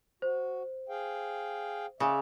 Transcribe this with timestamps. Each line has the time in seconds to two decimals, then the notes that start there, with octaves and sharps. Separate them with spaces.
0.22 F#4 C5
0.89 G#4 F5 G5
2.00 C#3 D5 E5